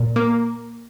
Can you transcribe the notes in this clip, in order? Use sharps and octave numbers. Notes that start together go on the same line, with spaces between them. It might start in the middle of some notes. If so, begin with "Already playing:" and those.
Already playing: A#2
A#3